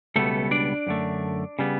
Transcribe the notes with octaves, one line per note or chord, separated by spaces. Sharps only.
C#2 B2 G3 A3 B3 A4
D4 D5
F#2 D3 A3
C#3 G3 B3